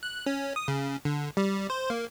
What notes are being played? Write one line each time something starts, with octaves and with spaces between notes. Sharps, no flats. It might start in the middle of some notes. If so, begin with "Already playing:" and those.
F#6
C#4
D#6
C#3
D3
G3
C5
A#3